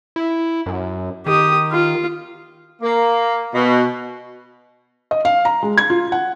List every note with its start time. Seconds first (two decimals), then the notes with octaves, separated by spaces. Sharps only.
0.16 E4
0.66 F#2
1.26 D#3 G4 D#6
1.72 F4
2.82 A#3
3.54 B2
5.11 D#5
5.25 F5
5.45 A#5
5.63 G#3
5.78 G#6
5.90 F4
6.12 F#5